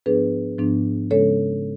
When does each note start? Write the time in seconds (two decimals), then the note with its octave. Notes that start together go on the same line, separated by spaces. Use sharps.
0.06 G#2 F3 B3 D4 G#4 B4
0.59 G#2 F3 B3 D4
1.11 C#3 G#3 C#4 A4 C#5